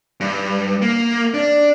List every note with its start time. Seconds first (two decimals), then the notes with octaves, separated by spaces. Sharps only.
0.21 G2
0.82 A#3
1.34 D4